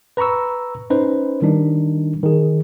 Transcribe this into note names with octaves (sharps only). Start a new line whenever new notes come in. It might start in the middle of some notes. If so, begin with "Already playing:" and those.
B4 A#5 B5 C#6 E6
C#4 D#4 B4 C5
D#3 G3 D4 D#4
D#3 G#4